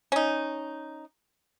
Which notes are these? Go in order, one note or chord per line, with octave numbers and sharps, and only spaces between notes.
C#4 D#4